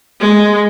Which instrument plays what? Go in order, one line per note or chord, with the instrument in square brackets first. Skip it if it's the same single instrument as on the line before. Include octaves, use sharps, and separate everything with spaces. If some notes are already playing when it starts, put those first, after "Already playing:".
[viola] G#3